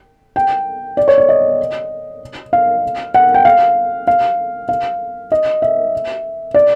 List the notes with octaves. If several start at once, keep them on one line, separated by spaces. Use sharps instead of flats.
G5
D5
C#5
D5
D#5
F5
F#5
G5
F5
F5
F5
D#5
E5
D5